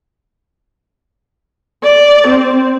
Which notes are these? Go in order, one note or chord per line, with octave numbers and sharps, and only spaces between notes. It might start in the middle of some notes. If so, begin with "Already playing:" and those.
D5
C4